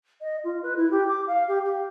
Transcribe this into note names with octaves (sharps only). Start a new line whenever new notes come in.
D#5
F4
B4
E4
G4
D6
F5
G4
G4